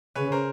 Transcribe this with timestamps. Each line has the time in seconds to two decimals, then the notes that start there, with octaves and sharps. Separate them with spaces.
0.15 C#3 B4 C#5
0.32 A#4 C5